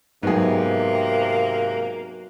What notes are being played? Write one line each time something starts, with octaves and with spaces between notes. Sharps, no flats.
G#2 C3 F#3 A#3 B3 D#4 G#4